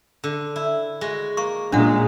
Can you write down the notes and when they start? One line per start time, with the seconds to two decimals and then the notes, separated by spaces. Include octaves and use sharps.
0.24 D3
0.56 E4
1.01 G#3 F#4
1.37 A#3 C#6
1.72 A#2 F#3 G#3 C#4 D4 F#5